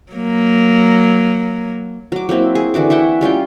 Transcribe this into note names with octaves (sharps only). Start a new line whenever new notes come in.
F#3 A#3
F#3 D6
F#3 A#3 C4 E4
G#4
D3 E3 F#4 D6
E4 E5 F#5 G5
G3 C#4 F4 G5